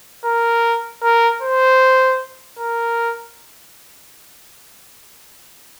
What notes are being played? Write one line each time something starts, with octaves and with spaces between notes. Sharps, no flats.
A#4
A#4
C5
A#4